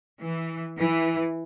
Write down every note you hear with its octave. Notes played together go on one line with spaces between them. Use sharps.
E3
E3